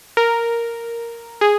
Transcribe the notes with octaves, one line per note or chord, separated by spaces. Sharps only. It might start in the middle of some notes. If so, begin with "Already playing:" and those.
A#4
G#4